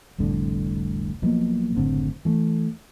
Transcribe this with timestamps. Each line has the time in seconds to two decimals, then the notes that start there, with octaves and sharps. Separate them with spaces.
0.18 F1 C2 A2 D3
1.22 B1 B2 F3 A#3
1.75 F#1 A2 D3 C4
2.25 E3 A3